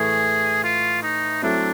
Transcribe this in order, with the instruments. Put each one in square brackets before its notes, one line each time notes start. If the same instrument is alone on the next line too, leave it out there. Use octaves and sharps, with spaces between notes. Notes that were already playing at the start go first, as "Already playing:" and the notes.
Already playing: [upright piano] A2 E3 A3 [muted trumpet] G#4
[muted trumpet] F4
D#4
[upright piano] F#3 A3 C4 E4 [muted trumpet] D4